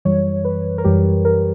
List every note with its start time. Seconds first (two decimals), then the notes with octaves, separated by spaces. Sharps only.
0.05 F#2 E3 G3 C#5
0.45 B4
0.78 A#4
0.84 F#2 E3 G3 G4
1.25 A#4